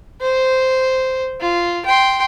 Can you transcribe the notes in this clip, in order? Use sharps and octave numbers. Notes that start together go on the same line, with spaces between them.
C5
F4
G5 C6